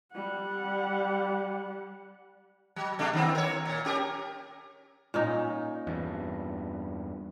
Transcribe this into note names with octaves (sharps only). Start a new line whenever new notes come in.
G3 F#5
F#3
C3 A3 D4
D#3 B3 C4
A#4 C#5
A#2
C#4 G4 A#4
A#2 C#4 D#4
E2 G2